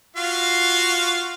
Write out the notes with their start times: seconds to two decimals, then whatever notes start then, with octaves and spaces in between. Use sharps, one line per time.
0.16 F4 F#4 F5